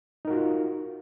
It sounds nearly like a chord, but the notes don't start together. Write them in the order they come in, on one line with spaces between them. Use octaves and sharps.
D#4 A#4 F#4 F4